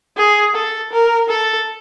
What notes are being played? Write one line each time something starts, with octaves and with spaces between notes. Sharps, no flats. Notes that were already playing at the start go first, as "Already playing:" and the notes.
G#4
A4
A#4
A4